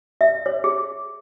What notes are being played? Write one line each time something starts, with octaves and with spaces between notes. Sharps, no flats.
E5
C#5
G#4